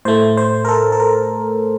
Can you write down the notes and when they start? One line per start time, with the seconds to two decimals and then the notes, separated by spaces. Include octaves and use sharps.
0.05 A2 A3 C5
0.37 C5
0.65 A#4
0.69 A4
0.92 A4
1.00 A#4